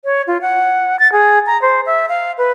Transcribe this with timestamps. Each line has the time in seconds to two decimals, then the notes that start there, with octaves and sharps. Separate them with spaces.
0.05 C#5
0.27 F4
0.42 F#5
0.99 A6
1.12 G#4
1.47 A#5
1.62 C5
1.86 E5
2.09 F5
2.38 B4